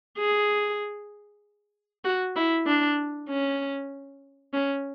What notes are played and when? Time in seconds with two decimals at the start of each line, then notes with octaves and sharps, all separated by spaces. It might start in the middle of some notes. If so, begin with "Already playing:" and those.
0.18 G#4
2.04 F#4
2.36 E4
2.67 D4
3.29 C#4
4.53 C#4